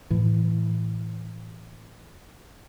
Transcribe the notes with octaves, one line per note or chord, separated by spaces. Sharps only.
A2 E3